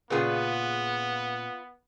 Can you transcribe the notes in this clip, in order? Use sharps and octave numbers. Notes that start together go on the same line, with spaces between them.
A#2 C#3 B3 F4 G#4 B4